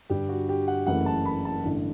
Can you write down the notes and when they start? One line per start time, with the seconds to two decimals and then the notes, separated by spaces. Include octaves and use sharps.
0.10 G2 D3 G3 G4
0.29 F#4
0.49 G4
0.68 F#5
0.87 F#1 F#2 C#3 E3 A3 F#5
1.06 A5
1.25 B5
1.45 A5
1.64 A1 G2 D3 A3